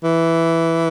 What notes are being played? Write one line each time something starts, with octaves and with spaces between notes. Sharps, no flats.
E3